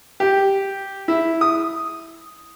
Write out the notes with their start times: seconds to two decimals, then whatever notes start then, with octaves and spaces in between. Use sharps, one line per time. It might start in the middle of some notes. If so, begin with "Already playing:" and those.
0.20 G4
1.08 E4
1.41 D#6